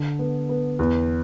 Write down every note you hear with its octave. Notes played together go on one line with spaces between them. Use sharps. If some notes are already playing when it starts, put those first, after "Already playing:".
Already playing: D3
B3
B3
E2